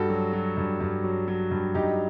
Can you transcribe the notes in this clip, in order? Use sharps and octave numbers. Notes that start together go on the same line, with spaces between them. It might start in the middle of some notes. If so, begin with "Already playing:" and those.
Already playing: G2 F#4 A4
F#3
F#3
G2
G2
F#3
F#3
G2
G2 D#4 G4